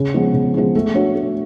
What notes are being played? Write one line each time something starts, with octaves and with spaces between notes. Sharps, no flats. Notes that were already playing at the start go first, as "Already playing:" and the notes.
Already playing: C#3
F3 G#3 B3
C#3
F3 G#3 B3
A3
D4 F#4 C#5
A3